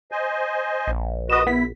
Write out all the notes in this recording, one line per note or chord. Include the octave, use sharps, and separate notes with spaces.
C5 D#5 G#5
A#1
F#4 B4 D#5 D#6 E7
B3 E4 B6